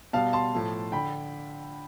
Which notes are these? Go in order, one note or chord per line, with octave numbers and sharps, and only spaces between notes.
B2 G3 F5 A5
A5 C6
A2 F3 A3
D3 G5 B5